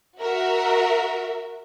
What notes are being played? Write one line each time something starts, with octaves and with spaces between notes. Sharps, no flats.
F#4 A#4 E5